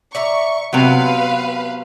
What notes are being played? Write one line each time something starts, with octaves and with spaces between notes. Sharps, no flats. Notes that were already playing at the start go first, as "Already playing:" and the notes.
D5 E5 A#5 C#6
C3 F#3 B3 B4 F5